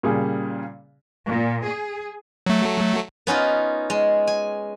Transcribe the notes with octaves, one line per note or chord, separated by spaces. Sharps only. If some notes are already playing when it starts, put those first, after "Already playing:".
A#2 C#3 G3 G#4
A#2
G#4
F#3 A3
B3 C#4 D#4 F4
G#3
G#5